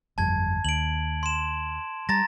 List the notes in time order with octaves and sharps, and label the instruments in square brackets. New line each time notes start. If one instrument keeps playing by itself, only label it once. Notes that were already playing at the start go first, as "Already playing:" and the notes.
[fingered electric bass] G1 F2 G3 [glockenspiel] A5 G#6
[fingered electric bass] D#2 [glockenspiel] D7 F#7
[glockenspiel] C6 E7
[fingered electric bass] G3 [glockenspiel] A#5 A6 A#6